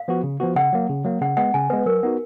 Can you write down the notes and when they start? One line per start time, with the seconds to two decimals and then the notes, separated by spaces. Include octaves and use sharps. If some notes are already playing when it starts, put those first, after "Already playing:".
Already playing: F5
0.08 F3 B3 F#4
0.23 C#3
0.40 F3 B3 F#4
0.56 C#3 F#5
0.73 F#3 A#3
0.89 C#3
1.04 F#3 A#3
1.21 C#3 F#5
1.37 G#3 B3 F#5
1.54 C#3 G#5
1.70 G#3 B3 B4
1.86 F#3 A#4
2.03 B3 D#4 F#4